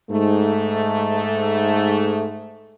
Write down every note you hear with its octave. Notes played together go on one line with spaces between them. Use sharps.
G#2 A3